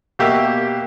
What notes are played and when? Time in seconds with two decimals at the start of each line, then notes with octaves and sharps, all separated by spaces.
0.19 B2 A#3 G4 E5